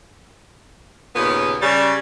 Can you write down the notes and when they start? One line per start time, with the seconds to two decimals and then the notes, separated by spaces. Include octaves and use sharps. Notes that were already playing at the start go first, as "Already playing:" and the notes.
1.16 D#2 A#2 C#3 B3
1.62 C#3 G3